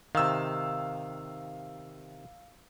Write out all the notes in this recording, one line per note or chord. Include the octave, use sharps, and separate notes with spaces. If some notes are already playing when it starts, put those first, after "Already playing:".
C3 D#3 F5 E6